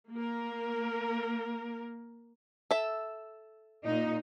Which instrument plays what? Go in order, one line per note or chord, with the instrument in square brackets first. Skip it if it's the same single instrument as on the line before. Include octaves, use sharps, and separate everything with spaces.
[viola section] A#3 A#4
[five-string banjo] A4 E5
[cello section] A#2 D#4